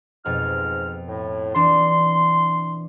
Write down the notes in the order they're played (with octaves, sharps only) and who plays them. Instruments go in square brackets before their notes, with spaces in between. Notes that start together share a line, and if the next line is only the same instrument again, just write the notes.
[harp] F2 B2 [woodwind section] G#2 F6
[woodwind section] A2
[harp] E3 D4 D6 [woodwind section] C6